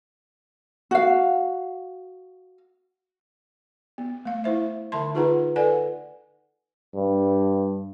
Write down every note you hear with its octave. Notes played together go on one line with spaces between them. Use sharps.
F#4 F5
B3
A3 F5
E4 C5 E5
D3 E5 A5 C6
D#4 F4 G#4 B4 F#5 A#5
A4 B4 D5 F#5 G#5
G2